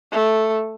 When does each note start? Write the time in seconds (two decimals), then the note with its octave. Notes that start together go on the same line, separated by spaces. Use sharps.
0.12 A3